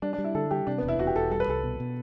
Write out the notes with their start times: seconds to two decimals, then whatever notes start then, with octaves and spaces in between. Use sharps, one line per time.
0.02 G3 D4
0.13 D4
0.18 G3
0.24 E4
0.35 D3 A4
0.51 G3 G4
0.67 C3 D4
0.78 E1 B3
0.88 E4
0.99 E1 F#4
1.07 G4
1.16 E1 A4
1.31 G3 A4
1.40 B4
1.48 C2 A4
1.64 B2
1.80 B2